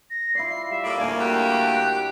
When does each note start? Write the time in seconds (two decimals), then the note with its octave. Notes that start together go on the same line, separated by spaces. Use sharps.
0.10 A#6
0.35 E4 F4 D5 C7
0.70 G3 E5
0.84 A2 A#3 D5
0.98 D2 A#3 D5 G#5 A5 B5
1.20 D4 F#4 G4 F#6